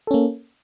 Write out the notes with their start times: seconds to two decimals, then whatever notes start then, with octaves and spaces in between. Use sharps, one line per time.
0.07 A4
0.11 C#4
0.14 A#3